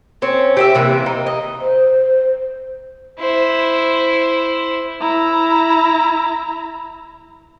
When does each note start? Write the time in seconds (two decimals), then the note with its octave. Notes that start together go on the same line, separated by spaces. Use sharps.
0.22 C4 C#4
0.57 G4 D#5 E5
0.75 C3 E3 A#3
1.06 D#4
1.27 D#5
1.61 C5
3.20 E4 C5
5.01 E4 A#5